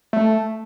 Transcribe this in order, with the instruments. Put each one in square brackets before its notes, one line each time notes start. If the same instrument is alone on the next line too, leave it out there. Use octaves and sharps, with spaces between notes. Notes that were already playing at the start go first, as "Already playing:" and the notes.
[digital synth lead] A3